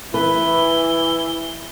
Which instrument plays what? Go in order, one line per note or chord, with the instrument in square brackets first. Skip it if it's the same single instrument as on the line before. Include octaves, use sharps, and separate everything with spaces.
[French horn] E3 [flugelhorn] E4 [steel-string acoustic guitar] B4 [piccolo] G7